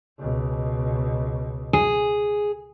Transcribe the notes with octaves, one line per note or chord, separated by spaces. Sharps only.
C#2 B2
G#4